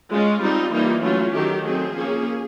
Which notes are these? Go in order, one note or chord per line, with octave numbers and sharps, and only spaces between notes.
G#3 C#4 F4
G3 C4 D#4
E3 G3 A#3 D#4
F#3 A3 C#4 F4
D#3 F#3 A3 G4
F#3 A3 C4 G#4
F3 A#3 C#4